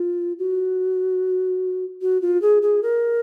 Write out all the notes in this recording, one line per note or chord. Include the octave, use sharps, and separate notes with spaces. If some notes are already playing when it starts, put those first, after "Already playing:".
Already playing: F4
F#4
F#4
F4
G#4
G#4
A#4